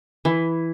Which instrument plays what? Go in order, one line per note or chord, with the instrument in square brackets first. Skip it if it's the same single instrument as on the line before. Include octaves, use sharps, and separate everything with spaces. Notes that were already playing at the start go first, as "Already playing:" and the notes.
[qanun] E3